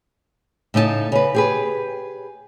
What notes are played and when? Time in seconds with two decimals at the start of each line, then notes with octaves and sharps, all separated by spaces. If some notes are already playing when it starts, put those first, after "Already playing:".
0.74 A2 C#3 D#4 D#5 A5
1.12 C#3 B4
1.35 G4 G#4 B4